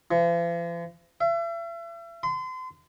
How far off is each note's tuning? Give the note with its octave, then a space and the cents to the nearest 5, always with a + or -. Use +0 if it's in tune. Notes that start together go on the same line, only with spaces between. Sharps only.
F3 -45
E5 +40
C6 -35